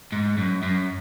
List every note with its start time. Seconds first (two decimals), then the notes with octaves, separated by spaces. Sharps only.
0.12 G#2
0.38 F#2
0.63 F#2